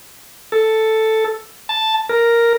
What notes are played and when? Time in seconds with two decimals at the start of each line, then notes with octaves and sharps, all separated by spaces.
0.52 A4
1.69 A5
2.09 A#4